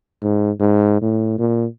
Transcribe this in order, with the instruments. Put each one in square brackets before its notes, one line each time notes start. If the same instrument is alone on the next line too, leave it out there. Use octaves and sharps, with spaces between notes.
[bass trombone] G#2
G#2
A2
A#2